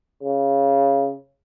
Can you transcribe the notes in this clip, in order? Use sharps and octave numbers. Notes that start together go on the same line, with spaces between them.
C#3